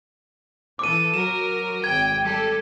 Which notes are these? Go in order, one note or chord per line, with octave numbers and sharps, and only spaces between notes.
E3 A4 D6 D#7
F#3 A#4 E7
G#1 G5 G#6
G3 G4 A4